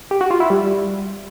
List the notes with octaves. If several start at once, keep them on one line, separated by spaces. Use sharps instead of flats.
G4
F#4
F4
E4
G3